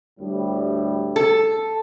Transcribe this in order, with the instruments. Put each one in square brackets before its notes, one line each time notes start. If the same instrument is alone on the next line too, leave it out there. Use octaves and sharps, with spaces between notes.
[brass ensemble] D2 A2 G3
[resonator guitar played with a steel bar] A4